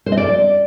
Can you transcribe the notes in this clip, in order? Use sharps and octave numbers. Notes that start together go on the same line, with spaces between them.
C5
D#5
D5